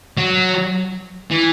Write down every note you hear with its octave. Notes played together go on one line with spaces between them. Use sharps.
F#3
E3